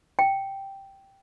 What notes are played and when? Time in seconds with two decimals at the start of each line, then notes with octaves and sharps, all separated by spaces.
0.19 G5